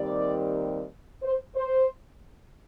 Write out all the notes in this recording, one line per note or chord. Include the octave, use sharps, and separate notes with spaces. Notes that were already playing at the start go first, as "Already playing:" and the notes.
Already playing: D#2 D#3 G3 C4 D5
C5
C5